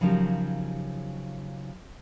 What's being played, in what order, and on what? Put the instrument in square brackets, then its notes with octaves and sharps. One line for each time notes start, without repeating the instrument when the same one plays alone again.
[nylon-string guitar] C#3 F3 F#3 D#4 G4 A#4